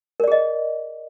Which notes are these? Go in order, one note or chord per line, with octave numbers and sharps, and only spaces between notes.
G#4 A#4 D5 D#5